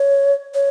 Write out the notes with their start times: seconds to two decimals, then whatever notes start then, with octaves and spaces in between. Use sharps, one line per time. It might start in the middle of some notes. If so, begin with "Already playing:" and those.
Already playing: C#5
0.54 C#5